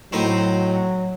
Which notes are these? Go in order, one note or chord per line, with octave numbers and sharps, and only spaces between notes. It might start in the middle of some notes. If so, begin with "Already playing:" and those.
A2 F#3 C4 D#4